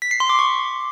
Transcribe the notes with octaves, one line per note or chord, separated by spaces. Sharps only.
B6
C7
C6
D6
C#6